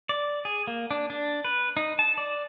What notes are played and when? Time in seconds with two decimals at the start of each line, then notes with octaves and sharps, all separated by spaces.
0.09 D5
0.45 G#4
0.67 A#3
0.91 D4
1.10 D4
1.45 B4
1.77 D#4
1.99 A5
2.18 D5